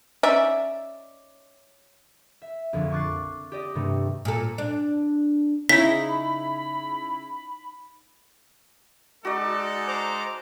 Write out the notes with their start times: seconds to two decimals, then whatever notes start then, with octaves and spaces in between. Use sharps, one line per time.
0.23 C#4 D#4 D5 E5
2.42 E5
2.73 A#1 F2 D3
2.91 C#6 D6 F#6 A6 C7
3.52 G4 D5 D#5
3.75 G2 C3 D#3 A3
4.25 A#2 A4
4.58 D4
5.69 C#3 D#4 E4 B5 B6
9.25 G#3 D#4 F#4 A4 D5
9.88 C5 A#5 D6